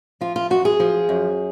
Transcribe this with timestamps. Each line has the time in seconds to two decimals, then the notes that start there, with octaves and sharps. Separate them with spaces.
0.21 F3 F4
0.36 F4
0.50 F#2 F#4
0.65 G#4
0.80 F3
1.09 F#2